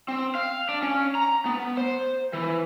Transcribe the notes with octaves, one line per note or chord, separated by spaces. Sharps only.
C4
F5
D4
C#4
A#5
B3
C5
E3